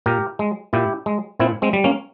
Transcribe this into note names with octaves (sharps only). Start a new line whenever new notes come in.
A#2 G4 A#4
G#3
A#2 E4 G4
G#3
A#2 C4 E4
G#3 C4
G3
A#3 C#4